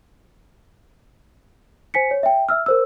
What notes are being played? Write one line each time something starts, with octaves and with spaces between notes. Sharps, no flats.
C5 G#5 B6 C#7
C#5
E5 G5
E5 E6 F6
A#4 C5 E6